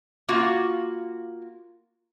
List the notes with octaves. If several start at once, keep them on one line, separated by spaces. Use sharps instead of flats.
A#3 F4 F#4